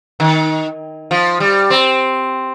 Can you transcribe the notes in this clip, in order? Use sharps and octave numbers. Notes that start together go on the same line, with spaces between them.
D#3
F3
G3
C4